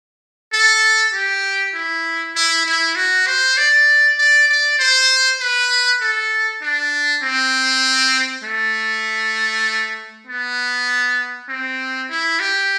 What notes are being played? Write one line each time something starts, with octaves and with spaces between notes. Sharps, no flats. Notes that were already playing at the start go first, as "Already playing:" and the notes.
A4
G4
E4
E4
E4
F#4
C5
D5
D5
D5
C5
B4
A4
D4
C4
A3
B3
C4
E4
G4